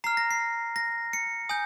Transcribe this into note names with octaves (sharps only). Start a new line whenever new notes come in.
A#5 F6 C7
A#6
C7
A#6
C#7
G#5 D#6 G6